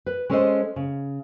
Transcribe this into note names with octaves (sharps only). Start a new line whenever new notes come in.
B4
G#3 C#4 A4 C5 C#5 D#5
C#3